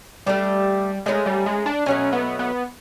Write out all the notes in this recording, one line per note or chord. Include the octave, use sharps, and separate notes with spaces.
G3 A3 D4 G4
G#3 A3 C#4 F4 A#4
G3
G#3
D4
B2 F#3 A3 C#4
B3
B3